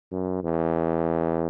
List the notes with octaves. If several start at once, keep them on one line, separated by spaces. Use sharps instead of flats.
F#2
E2